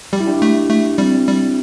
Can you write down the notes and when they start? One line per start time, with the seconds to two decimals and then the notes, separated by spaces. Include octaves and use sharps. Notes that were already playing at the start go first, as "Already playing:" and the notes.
0.13 G3 G4
0.20 E4
0.27 D4 G4
0.42 A3
0.70 A3
0.98 G3 C4
1.27 G3